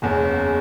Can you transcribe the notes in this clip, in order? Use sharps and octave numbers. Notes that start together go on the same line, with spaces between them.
F#1 E2 C#3